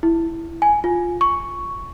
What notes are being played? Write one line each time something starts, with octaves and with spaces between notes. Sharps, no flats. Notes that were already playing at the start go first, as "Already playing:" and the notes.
E4
G#5
F4
C#6